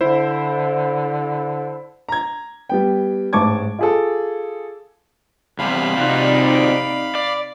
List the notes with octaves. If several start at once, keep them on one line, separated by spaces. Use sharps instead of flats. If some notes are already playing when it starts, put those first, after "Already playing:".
D3 E4 C5
A#5 G#6
G3 B3 G5
A1 G#2 A5 C#6 D6 G#6
F4 G#4 A4
E2 C3 G3 F5 B5
C3 C4 D#4 F4 F#4 D5
D5